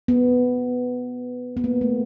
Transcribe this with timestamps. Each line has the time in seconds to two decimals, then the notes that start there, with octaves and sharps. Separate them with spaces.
0.08 B3
1.57 B3
1.64 A#3
1.81 A3